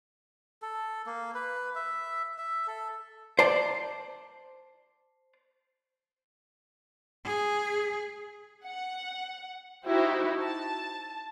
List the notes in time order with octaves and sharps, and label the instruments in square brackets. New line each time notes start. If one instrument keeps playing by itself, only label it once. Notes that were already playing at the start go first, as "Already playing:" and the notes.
[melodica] A4
A#3
B4
E5
E5
A4
[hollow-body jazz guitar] C5 D5 A5
[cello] G#4
[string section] F#5
D#4 E4 F#4 G4 C5
A5